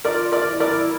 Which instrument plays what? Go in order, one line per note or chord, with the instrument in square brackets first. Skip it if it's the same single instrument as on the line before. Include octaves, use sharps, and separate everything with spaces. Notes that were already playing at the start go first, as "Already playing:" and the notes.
[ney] F4 [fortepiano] A#4 D5
[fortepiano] A#4 D5
[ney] E4
[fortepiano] A#4 D5